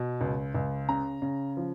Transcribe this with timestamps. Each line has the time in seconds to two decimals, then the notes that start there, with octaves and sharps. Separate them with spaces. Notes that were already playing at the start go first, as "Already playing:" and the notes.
Already playing: B2
0.21 C#2
0.55 C#2
0.89 C#3 A#5
1.22 C#3
1.57 F3